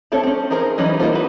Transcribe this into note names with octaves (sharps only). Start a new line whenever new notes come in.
A3 C4 D4 A4 C#5
C4 C#4
D#4 E4 G#4 A#4 C5
E3 F#3 G3 C#4 D#4
A#3 C4 D#4 F4 C5
E4 F#4 B4